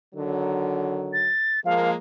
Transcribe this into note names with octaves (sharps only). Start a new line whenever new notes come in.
D3 D#3 F#3
A6
F3 G#3 A#3 F5